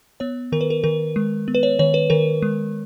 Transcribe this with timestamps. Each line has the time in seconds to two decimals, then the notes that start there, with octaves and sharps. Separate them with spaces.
0.20 B3 C#5
0.52 D#3 A#4
0.61 B4
0.70 A#4
0.84 D#3 A#4
1.16 G#3
1.48 B3
1.55 B4
1.63 C#5
1.79 D#3 C#5
1.94 B4
2.10 D#3 A#4
2.42 G#3